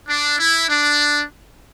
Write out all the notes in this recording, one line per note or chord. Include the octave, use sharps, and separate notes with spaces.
D4
E4
D4